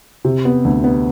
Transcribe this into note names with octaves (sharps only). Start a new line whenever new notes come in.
C3
B3
D2
B3